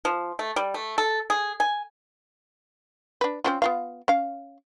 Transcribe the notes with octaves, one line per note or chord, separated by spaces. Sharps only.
F3
A3
G3
A3
A4
G#4
G#5
D4 B4
C4 C#4 F4
B3 F4 F5
C#4 F5